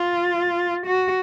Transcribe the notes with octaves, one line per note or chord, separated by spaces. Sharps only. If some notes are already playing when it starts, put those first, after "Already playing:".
Already playing: F4
F#4